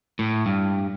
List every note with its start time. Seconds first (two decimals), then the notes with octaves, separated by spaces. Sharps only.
0.19 A2
0.46 G2